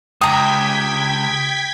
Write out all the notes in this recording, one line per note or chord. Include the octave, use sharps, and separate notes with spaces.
C#2 G4 G5 A#5 D#6 G#6 B6